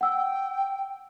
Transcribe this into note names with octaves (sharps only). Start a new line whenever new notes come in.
F#5 G5 E6